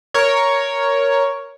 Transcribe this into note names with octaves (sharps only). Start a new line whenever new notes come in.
A#4 C#5